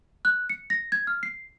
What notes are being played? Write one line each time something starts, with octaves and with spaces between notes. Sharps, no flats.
F#6
C#7
A#6
G#6
F6
C7